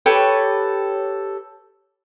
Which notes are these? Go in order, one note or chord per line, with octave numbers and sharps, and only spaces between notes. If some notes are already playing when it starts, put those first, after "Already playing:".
G4 A4 B4 C#5